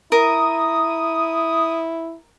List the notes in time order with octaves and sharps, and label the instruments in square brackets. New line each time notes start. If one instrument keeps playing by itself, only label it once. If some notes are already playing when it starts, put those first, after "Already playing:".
[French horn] E4 [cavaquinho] A#4 [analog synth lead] D#6